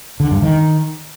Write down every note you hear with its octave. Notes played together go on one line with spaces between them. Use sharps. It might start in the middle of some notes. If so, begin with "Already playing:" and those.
D3
G2
D#3